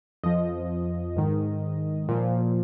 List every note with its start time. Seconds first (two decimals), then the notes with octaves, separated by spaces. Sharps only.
0.23 F2 F3 D#5
1.16 G#2 D#3
2.09 A#2 F3